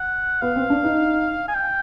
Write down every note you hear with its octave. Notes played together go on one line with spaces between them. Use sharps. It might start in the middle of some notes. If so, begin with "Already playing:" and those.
Already playing: F#5
B3 F5
C4
D4
D#4
G#5
G5